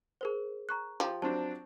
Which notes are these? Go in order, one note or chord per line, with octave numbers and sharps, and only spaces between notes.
G#4 A#4 C5
A#5 C#6 F#6
F3 G4
F#3 C4 D4 C5 A5